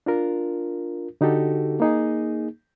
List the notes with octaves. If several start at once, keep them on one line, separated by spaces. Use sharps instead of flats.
D4 F4 A#4
D3 D#4 F#4 G4 A4
A#3 D#4 G#4